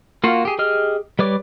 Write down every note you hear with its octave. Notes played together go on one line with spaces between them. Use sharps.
A#3 F4 F#4
G4 G#4
G4 G#4 D#5 F6
G3 B4 C#5 D5 D6